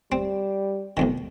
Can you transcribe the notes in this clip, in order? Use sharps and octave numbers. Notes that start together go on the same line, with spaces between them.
G3 C4
B1 F2 D#3